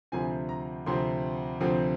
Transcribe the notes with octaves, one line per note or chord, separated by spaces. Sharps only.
D2 C3 F3 C4 G#5
A#5
D2 C3 F3 C4 C6
D2 C3 F3 C4